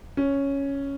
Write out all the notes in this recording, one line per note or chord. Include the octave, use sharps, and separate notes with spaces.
C#4